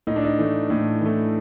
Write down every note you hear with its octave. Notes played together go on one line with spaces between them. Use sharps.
A2 D#4
D4
D#4
E3 A3
A2
E3 A3